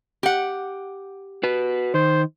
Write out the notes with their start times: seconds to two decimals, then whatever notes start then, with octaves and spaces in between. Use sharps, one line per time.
0.23 G4 F#5
1.43 F#4 B4
1.94 D#3 C5